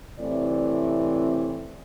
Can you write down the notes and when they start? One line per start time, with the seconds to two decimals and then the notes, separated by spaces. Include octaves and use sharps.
0.19 A2 C3 E3 C4 D5